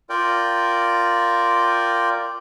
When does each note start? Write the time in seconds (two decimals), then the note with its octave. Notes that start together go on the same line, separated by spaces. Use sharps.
0.09 F4 A#4 D5 G5